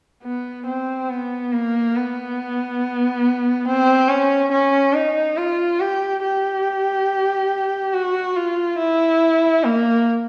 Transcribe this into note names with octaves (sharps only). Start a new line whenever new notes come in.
B3
C4
B3
A#3
B3
C4
C#4
C#4
D#4
F4
G4
G4
F#4
F4
E4
A#3